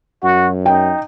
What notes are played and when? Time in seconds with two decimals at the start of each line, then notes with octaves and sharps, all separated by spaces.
0.24 F#2 F#4
0.66 D#4 G5